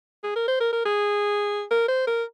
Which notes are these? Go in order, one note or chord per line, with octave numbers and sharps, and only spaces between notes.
G#4
A#4
C5
A#4
A#4
G#4
A#4
C5
A#4